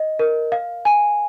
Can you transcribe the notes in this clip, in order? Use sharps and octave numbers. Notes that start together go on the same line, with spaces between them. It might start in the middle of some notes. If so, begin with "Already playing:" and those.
Already playing: D#5
A#4
F5
G#5